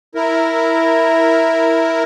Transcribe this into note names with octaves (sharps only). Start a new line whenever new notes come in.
E4 A#4